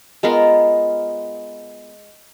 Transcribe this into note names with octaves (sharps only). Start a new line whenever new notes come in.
G#3 B3 F4 A#4